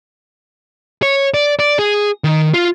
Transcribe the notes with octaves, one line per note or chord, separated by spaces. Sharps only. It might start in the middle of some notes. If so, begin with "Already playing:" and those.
C#5
D5
D5
G#4
D#3
F4